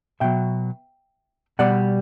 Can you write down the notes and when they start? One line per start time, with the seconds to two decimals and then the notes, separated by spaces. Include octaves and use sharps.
0.20 B2 F#3 E5 G5
1.59 B2 G3 D5 F#5